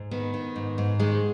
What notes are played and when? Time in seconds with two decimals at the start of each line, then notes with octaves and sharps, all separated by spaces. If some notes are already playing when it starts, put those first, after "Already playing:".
Already playing: G#2
0.11 D#3 B3
0.34 D#3
0.56 G#2
0.78 G#2
1.00 D#3 G#3